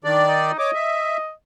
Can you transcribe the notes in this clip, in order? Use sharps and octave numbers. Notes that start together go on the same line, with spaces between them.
D#3 D4 D5
D#4
C#5 D#5 D6
E5